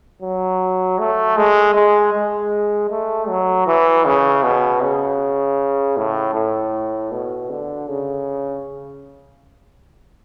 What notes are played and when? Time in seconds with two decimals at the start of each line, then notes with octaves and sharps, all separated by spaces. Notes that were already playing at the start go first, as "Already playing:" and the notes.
0.22 F#3
0.99 A3
1.37 G#3
1.75 G#3
2.14 G#3
2.90 A3
3.28 F#3
3.67 E3
4.05 C#3
4.43 B2
4.82 C#3
5.97 A2
6.35 A2
7.12 B2
7.50 D3
7.88 C#3